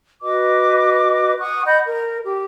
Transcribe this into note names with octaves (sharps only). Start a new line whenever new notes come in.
F#4 B4 D#5 D6
F#5 C#6 D#6 F#6
D#5 F#5 B5 G6
A#4
G4